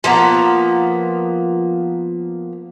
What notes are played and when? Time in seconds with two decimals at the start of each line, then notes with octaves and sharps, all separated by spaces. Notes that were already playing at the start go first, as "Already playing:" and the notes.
0.04 F3 A#3 B3 A#5